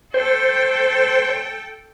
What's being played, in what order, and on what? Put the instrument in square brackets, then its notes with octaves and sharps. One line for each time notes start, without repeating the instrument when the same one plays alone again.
[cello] A4 G5 [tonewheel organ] C5